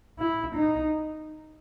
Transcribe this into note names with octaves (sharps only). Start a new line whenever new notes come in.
E4
D#4